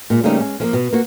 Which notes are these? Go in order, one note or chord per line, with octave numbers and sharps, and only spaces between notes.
A#2 G#3
C#3 G3 A3 A#3 C4 D#4
G#3 C#4
F3 A3 A#3
B2
A#3 F#4